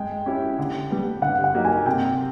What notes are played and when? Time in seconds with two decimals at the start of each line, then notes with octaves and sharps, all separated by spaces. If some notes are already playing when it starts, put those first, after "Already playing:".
Already playing: G#3 G5
0.26 C#4 E4 G4
0.58 D3
0.90 G3 B3
1.22 D3 F#5
1.44 F#5
1.54 F#3 A#3 D#4 G4
1.65 G#5
1.86 C3 G5